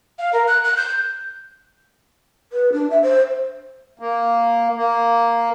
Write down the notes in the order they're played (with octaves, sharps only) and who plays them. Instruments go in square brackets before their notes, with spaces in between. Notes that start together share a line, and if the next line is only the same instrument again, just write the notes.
[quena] F5
A#4
F#6
F#6
G6
[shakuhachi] B4
D4
E5
C5
[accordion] A#3
A#3